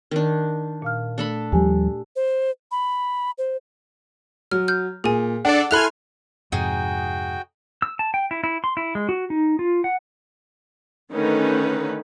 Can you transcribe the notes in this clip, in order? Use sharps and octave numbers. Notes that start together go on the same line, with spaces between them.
D#3 D4
A#2 F5 F6
A3 D4 A4 B5
D#2 F3 G3 G4 G#5
C5
B5
C5
F#3 F6
F6 G6
A#2 G#4 G#5
D4 A4 D5 F#5
E4 A4 G#5 B5 C6 F6 F#6 F7
F2 G#2 C3 D#4 F#4 G#4 G5
E6
A5
G5
E4
E4
C6
E4
G#3
F#4
D#4
F4
F#5
D3 D#3 A3 C#4 D#4 B4